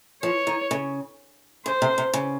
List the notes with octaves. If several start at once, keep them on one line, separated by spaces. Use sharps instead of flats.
F3 C#5
D#3
C#3
C#3 C5
C3
C3
C#3